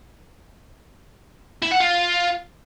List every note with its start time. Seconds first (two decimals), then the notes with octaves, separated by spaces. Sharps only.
1.63 E4
1.72 F#5
1.80 F4